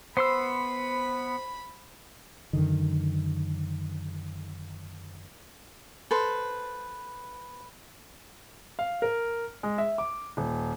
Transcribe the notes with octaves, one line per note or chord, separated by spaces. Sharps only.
B3 C5 B5 C6 E6
F#2 D3 D#3
A4 B4 C5
F5
A#4
G#3
E5
D6
D#1